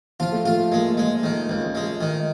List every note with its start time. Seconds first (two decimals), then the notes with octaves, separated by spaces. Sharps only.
0.20 F3 F4
0.32 A3
0.45 A3 F4
0.72 G#3 A#3
0.97 G#3
1.23 D#3
1.49 C#2
1.75 G#3
2.01 D#3